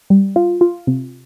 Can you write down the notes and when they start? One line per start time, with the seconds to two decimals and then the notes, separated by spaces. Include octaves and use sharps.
0.10 G3
0.36 F4
0.61 F4
0.87 C3